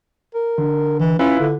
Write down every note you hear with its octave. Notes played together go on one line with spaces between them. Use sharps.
A#4
D3
E3
C#4 E4 F4 B4
D3